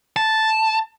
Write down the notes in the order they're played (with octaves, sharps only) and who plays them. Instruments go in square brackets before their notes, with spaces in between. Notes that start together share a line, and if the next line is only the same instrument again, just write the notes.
[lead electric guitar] A5